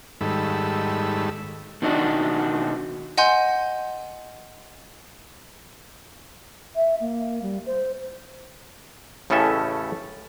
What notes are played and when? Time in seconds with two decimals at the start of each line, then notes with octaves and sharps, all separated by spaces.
0.21 G#2 D#3 G3 A4 B5 E6
1.82 B2 D#3 B3 D4 D#4 F#4
3.17 D#5 F#5 G#5 C6 G6
6.76 E5
7.01 A#3
7.42 G3
7.66 C5
9.30 A1 A2 C#3 C#4 A4 E5